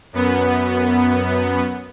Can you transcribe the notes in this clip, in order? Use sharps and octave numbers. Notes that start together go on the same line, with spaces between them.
F#2 B3